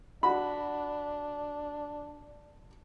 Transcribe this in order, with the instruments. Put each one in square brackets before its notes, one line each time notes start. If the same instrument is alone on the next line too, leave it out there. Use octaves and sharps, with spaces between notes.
[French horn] D4 [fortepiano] F#4 B5